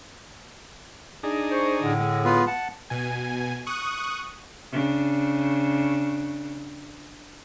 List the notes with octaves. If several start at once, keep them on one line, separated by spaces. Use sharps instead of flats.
D4 D#4 G#4
C5 C#6
A2 D3
G#3
B3 F4 B4
F#5 A5
B2 G#5
C#6 D#6 F#6
C#3 D4